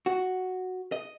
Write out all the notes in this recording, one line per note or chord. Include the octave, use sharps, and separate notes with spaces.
F#4
D#5